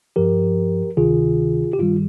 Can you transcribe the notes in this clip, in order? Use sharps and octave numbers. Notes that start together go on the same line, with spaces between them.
G2 F3 G4 A#4
D2 C3 D#3 F4 G#4
G4
G2 D#3 G3 F4